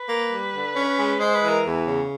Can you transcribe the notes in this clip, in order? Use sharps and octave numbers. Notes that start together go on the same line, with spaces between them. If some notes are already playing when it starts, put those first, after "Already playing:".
Already playing: B4
A#3
G3
D3
C#4
G#3
G#3 C5
B4
E3
A#4
E2
C#3